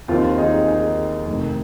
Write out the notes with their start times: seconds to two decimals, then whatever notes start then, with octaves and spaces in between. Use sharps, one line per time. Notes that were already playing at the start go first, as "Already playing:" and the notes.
0.08 D#2 D#3 C4 F4
0.38 D#4 G#4
0.67 D#4 G#4
1.26 F1 F2 D#3